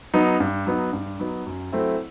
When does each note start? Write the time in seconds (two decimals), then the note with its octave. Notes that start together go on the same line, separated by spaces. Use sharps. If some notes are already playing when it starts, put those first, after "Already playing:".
0.14 F#3 B3 D#4
0.40 G2
0.66 F#3 B3 D#4
0.93 G2
1.19 F#3 B3 D#4
1.46 F#2
1.72 F#3 A3 C4 E4